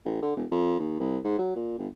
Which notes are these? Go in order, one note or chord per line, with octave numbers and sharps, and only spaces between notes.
A1
D3
E1
F2
D#2
C2
G#2
F#3
A#2
G1